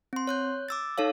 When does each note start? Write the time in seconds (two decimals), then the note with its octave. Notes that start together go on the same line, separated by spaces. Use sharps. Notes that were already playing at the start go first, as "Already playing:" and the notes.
0.13 C4 C6
0.27 C#5 F#6 G6
0.69 D6 E6 A6
0.98 D#4 A4 C#5 F5